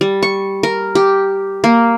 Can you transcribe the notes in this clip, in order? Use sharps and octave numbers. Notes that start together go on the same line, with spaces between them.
G3
C#6
A#4
G4
A#3